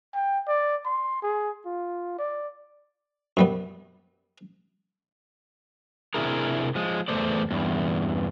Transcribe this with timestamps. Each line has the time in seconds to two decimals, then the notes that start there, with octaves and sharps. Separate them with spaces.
0.14 G5
0.48 D5
0.85 C6
1.23 G#4
1.66 F4
2.19 D5
3.37 F#2 G3 B3
6.14 C3 D4 E4 G#4 A#4
6.75 F3 G#3
7.08 E2 A3 C5 D5
7.51 E2 G2